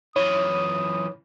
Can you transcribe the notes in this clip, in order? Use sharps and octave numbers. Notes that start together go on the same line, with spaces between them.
F#2 E3 C#5 D#6